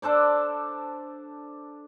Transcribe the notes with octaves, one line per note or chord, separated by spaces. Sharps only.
D4 A4 C5 D5